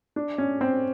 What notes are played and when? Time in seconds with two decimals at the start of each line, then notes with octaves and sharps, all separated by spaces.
0.16 D4
0.38 C#4
0.61 C4